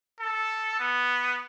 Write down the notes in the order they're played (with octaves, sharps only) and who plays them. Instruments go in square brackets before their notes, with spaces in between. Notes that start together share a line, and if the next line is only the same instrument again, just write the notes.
[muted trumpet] A4
B3